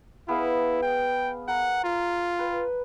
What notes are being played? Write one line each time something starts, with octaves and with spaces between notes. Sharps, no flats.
B3 E4 G#4 F5
G5
A#4 F#5
F4
B4 G5